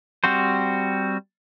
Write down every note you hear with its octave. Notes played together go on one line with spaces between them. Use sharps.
G3 C4 F#4 C5